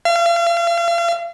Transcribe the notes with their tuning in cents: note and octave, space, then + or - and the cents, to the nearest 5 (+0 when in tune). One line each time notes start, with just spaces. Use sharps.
F5 -40